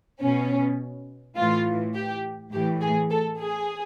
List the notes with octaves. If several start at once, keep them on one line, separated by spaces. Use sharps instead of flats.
B2 C#4
A2 E3 F4
G4
A2 E3 G4
G#4
A4
G#4